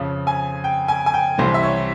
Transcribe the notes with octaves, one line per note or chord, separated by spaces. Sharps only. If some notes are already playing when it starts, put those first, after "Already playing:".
Already playing: F2 C#3 F3
G#5
G5
G#5
G#5
G5
C2 C3 E3 G3 C5
E5
C#5